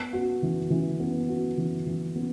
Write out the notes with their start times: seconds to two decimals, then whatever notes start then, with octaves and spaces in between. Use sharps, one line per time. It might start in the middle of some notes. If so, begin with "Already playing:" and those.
Already playing: B3
0.13 F#4
0.42 E3
0.70 E3
1.00 B3
1.29 F#4
1.58 E3
1.86 E3
2.16 B3